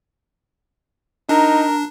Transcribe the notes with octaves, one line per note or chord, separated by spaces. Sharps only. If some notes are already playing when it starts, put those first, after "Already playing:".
D4 D#4 A#4